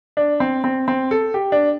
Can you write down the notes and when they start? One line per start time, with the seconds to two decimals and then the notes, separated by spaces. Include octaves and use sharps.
0.17 D4
0.40 C4
0.64 C4
0.88 C4
1.11 A4
1.34 G4
1.52 D4